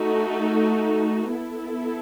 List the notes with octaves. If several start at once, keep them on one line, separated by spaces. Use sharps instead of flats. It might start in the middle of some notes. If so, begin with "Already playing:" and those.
Already playing: A3 D#4 F#4
B3 E4 A4